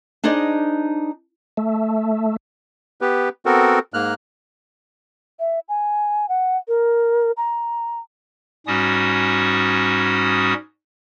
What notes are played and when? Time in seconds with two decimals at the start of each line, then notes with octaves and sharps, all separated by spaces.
0.24 D4 D#4 G#4 C5 D5 D#5
1.57 A3
3.01 B3 G4 B4
3.46 B3 C4 F#4 A4 A#4
3.94 G#2 A#3 F6 F#6
5.40 E5
5.69 G#5
6.29 F#5
6.68 A#4
7.37 A#5
8.67 G#2 G3 C#4 F#4 D#6